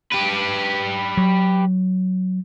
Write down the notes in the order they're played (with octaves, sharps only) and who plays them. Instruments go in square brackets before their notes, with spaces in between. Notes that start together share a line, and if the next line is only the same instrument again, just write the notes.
[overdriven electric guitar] G4 B4
[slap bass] F#3